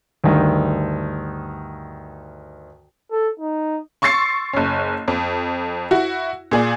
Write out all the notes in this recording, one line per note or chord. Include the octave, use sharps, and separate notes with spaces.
D2 G2 D#3
A4
D#4
C6 C#6 E6 A6 C7 C#7
F#1 C#4
F2
E4 F#4
A#2 G#4 D5